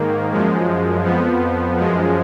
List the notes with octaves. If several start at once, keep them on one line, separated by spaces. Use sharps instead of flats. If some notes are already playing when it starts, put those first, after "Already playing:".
Already playing: G#2 D#3 A#3
F#2 F3 G#3
F2 F3 B3
F#2 F3 G#3